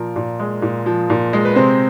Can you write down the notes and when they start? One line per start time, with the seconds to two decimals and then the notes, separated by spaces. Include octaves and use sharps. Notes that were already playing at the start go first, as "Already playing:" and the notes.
Already playing: A#2 F3 A#4
0.16 A#2
0.39 G#3
0.62 A#2
0.86 F3
1.10 A#2
1.33 G#3
1.45 B4
1.56 C3 C4 C5